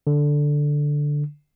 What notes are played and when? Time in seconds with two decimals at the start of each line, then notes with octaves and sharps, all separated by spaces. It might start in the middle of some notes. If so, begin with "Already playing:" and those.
0.07 D3